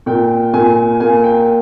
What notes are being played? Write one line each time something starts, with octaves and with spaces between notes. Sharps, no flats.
A#2 G5
A#2 G#5
A#3 G#5
G5